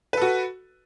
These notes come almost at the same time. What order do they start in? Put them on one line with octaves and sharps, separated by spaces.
B4 A4 F#4